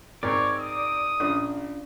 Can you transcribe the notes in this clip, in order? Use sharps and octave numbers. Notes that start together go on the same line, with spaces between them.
G#1 C4 A#4 C#5 D5
D#6
A#1 C#4 D4 F4